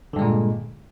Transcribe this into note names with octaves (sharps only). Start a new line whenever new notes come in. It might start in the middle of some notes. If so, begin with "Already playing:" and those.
G2 A#2 D3 G#3